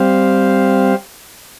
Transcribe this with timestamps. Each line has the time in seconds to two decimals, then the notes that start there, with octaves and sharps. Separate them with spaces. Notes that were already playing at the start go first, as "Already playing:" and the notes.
Already playing: G3 C4 G4 C5 F5